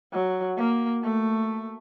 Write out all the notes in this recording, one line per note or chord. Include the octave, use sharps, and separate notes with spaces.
F#3
A#3
A3